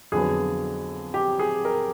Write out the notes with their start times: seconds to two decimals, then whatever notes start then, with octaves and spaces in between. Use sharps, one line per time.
0.12 F2 D3 F#3 B3 G#4
1.14 G4
1.39 G#4
1.65 A#4